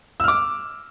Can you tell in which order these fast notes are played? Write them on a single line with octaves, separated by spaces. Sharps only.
E6 F6 D6